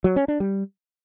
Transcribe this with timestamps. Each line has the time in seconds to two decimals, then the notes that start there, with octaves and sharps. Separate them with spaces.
0.04 F#3
0.16 C#4
0.28 D4
0.40 G3